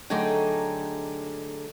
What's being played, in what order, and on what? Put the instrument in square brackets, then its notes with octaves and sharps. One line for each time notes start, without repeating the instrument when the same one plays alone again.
[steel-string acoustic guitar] D3 F#3 A3 D#4 G#4 G5